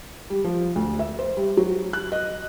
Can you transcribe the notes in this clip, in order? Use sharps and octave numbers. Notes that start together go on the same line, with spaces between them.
G3
F3
D2
E5
C5
G3
F#3
F#6
D#5